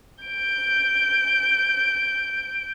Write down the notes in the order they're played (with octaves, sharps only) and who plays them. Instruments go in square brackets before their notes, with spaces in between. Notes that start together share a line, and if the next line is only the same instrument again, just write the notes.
[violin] G6 D7